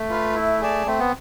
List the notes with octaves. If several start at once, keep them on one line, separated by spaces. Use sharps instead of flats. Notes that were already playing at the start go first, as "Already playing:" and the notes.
Already playing: A3
F4 B4 F5
E4
G#4 D5 A5
A3 C4
B3